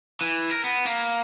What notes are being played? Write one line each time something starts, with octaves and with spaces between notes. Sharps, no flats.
E3
A#4
B3
A#3